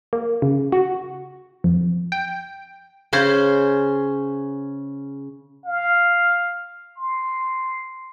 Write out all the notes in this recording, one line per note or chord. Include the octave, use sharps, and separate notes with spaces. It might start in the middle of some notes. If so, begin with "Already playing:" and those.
A#3
C#3
F#4
F2
G5
C#3 C#4 C5
F5
C6